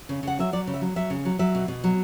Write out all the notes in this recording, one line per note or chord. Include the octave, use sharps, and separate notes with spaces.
C#3
C#3 F#5
F#3 E5
F#3 D5
C#3
E5
F#3
F#3 E5
C#3
F#3
F#3 E5
B2
B2
F#3